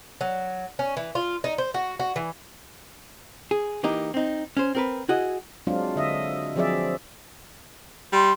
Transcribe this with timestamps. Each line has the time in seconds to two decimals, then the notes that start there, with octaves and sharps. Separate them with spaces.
0.21 F#3
0.79 C#4
0.97 E3
1.15 F4
1.44 D#4
1.58 C5
1.74 F#4
2.00 F#4
2.16 E3
3.51 G#4
3.83 E3 A#3 D#4 G4
4.14 C4 D#4
4.57 C#4 C5
4.75 C4 A#4 B4
5.08 E4 F#4 G#4 D#5
5.67 F#3 G#3 C4 D4 F4
5.96 D3 D#5 E5
6.56 F3 F#3 C4 G#4 D5 E5
8.13 G3 C6